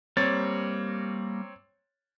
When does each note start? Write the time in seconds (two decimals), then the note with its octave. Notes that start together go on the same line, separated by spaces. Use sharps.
0.17 G3 A#3 C4 C#5 A6